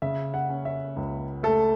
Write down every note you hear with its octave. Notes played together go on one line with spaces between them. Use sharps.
C#3 E5
F#5
C#4
E5
C#2
A3 A4